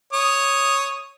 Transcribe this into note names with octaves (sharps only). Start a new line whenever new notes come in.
C#5 D#6